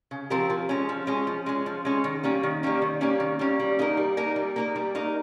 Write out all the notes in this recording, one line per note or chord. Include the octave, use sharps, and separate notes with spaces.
C#3
F3 C4 G4 A#4
F3
G#3 C#4
F3
G#3 C#4
F3
G#3 C#4
F3
G#3 C#4
D#3
G3 A#3 C#4
D#3
G3 A#3 C#4
D#3
G3 A#3 C#4
D#3
G3 A#3 C#4
G3
A#3 D#4 A#4
G3
A#3 D#4 A#4
G3
A#3 D#4 A#4
G3
A#3 D#4 A#4